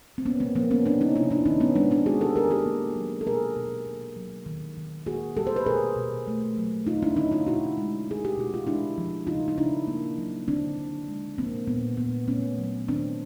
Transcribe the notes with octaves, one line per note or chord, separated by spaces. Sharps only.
C4
A#3 B3 C#4
A#3 C4
F3 A#3 C4
B3 C#4
C3 C4 D4
C#4 D#4
C3 D4 E4
D4 E4
D#3 C#4 D#4
B3 C#4
G#3 C4 D4
C4 D4
G#3 F#4 G#4
G4 A4
D#3 G#4 A#4
G4 A4
A#3
F#3
A4
B2 G#4 A#4
B2
A#3
F#3
D#3
D#3
A#3 F#4 G#4
G3 G4 A4
C5
B4
B2 G#4 A#4
B2
A3
F#3
D3 D#4 F4
D4 E4
D3 C#4 D#4
D#4 F4
B2 E4 F#4
G#3
G#3 G#4
G4
B2 F#4
F4
G#3 D4 E4
F3
C#3 D#4 F4
D#4
C#3 D4 E4
A#3
F#3
D3 C4 D4
D3
G#3
F3 A#3 C4
A#2 B3
A#2 B3
A3 B3 C#4
F#3
D#3 C4 D4